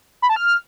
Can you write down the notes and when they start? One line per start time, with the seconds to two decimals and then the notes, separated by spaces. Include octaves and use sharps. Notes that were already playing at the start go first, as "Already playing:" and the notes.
0.22 B5
0.29 A5
0.36 F6